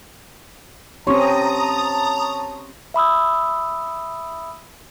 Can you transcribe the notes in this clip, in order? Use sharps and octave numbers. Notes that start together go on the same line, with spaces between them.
C4 C#4 G4 C#5 A5 A#5 C6 D#6
E5 B5 D#6 E6